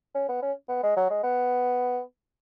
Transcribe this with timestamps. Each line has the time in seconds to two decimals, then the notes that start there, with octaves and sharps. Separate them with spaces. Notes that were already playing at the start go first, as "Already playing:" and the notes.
0.15 C#4
0.29 B3
0.42 C#4
0.69 B3
0.83 G#3
0.96 F#3
1.10 G#3
1.23 B3